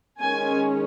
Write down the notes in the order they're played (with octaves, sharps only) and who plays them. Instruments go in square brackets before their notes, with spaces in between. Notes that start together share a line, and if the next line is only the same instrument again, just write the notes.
[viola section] D#3 G#3 C#4 G#5